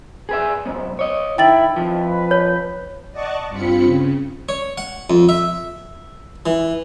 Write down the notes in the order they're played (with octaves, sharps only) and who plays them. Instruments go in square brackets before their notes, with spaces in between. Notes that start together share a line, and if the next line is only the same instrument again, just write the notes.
[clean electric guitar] G#4 B4 E5
B1 G#2 B3
C#5 D#5
[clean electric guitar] D#3 [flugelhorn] E4 [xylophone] G5 A6 F#7
[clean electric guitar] F2 F3 [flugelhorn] B4
[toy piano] C#5
[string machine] D5 D#5 F#5 A5 C#6
G2 C4 F4 B5 C#7
C#3
[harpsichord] C#5
F#5
F2
E5
E3